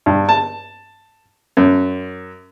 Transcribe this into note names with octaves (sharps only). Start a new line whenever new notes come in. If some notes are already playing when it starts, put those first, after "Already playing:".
G2
A5
F#2